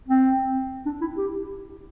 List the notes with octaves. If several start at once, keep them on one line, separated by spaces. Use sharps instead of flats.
C4
D4
E4
G4